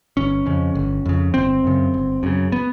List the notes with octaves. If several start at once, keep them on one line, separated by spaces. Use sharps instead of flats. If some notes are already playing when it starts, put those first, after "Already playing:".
G1 C#4
F2 C#3
G1
F2 C#3
G1 C4
F#2 C#3
G1
F#2 C#3
B3